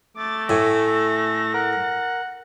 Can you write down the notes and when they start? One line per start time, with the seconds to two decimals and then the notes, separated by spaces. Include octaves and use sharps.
0.17 A3 D6 A6
0.49 A2 E5 G#5 C#6 A#6
1.54 A#4 F#5